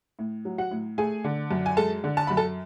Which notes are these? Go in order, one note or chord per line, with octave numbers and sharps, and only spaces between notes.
A2
F#3
F#4 F#5
A2
A3 G#4 G#5
D3
F#2
G#5
G#3 A4 A5
D3
A5
F#2 B5
A4 A5